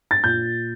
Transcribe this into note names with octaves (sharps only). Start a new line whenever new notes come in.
A6
A#2 G6